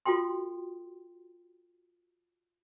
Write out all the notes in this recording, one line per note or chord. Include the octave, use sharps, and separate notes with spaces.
F4 F#4 A4 G5 C6